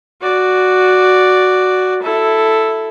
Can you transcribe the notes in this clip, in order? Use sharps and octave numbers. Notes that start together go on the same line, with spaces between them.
F#4 D5
E4 A4